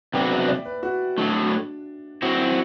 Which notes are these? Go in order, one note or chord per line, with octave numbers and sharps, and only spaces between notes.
C3 F#3 B3 D4 F#4 G5
E5
D5
B4
F#4
A2 F#3 A3 D4
F#3 C4 E4 F#4
E4